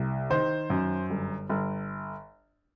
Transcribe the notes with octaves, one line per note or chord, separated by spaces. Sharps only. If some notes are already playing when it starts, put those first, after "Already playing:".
Already playing: C2
D#3 C5
F#2
G1
G1